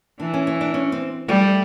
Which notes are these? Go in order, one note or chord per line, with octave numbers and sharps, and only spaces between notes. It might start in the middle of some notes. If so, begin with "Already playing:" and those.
E3 D4
C#4
C#4
D4
C#4
C4
G3 A3